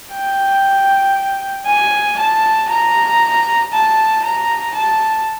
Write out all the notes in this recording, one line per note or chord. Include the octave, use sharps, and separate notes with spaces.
G5
G#5
A5
A#5
A5
A#5
A5